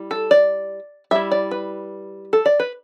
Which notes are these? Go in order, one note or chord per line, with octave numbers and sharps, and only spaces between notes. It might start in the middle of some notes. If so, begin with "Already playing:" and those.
Already playing: G3 E4
A4
D5
G3 E4 E5
D5
B4
A4
D5
B4